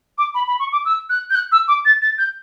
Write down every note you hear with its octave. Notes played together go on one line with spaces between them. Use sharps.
D6
B5
B5
C#6
D6
E6
F#6
G6
F#6
E6
D6
A6
A6
G6